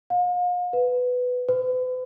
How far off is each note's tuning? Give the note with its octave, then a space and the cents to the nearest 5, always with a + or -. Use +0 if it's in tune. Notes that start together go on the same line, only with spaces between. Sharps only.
F5 +40
B4 +10
B4 +40